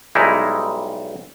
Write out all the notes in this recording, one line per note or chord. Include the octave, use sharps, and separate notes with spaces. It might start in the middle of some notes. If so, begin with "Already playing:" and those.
B1 G3 G#3 D#4 E4